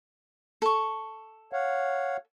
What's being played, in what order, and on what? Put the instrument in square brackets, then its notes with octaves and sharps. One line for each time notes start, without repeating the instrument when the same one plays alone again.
[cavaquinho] A4 C#6
[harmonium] C#5 F5 F#5